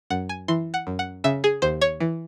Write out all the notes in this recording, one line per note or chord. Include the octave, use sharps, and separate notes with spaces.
F#2 F#5
G#5
E3 C6
F#5
F#2
F#5
C#3 E5
G#4
D#2 C5
C#5
E3